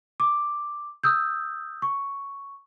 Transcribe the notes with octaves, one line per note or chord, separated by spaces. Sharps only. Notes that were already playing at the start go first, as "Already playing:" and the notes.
D6
D#6 E6 G6
C#6